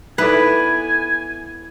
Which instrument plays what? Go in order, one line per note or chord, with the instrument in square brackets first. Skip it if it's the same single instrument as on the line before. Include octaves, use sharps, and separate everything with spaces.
[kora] B3 E4 D5 [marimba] D#4 A4 [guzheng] B4 [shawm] G#5